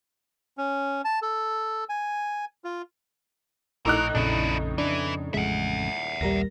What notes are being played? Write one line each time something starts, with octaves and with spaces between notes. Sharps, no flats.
C#4
A5
A4
G#5
F4
A#1 A2 D#4 A#4 D6 E6 F#6
A#1 F2 C#3 D4 E4
E3 D4 E4
A1 F2 C#3 G#3 E5 F#5
A#1 D#2 G3 A#4 A#6